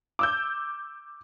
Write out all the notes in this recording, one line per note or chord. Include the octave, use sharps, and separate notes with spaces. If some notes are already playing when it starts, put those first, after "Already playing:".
D6 E6 G6